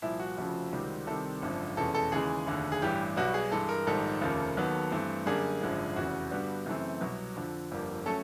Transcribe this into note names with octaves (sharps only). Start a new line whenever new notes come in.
C2 A#2 F3 E4
F#4
F1 F2 C#3 F3
C#2 C3 D#3 G3 C4
C2 C3 D#3 G3 C4 A4
G#1 F#2 D3 F3
F1 E2 B2 G#3 C#4 A4
A4
D#2 C#3 E3 G#3 G#4
F1 D#2 D3
G#4
A1 G2 E3 G3 G4
B1 B2 G3 F#4
G#4
G2 E3 G#3 A4
A#4
A#1 G#2 D#3 G3 A4
F1 D#2 C#3 F3 A#3
D#2 D#3 F#3 B3
G2 E3 A3 C4
F#2 D3 G3 A#3 G#4
G#1 F#2 D3 F3
F1 E2 C#3 F#4
G2 D3 G3 B3
F#2 C#3 E3 A3 C4
C2 B2 F#3
F2 D3 F3
G1 F2 D3 G3 A#3
F#3 A3 C#4 A4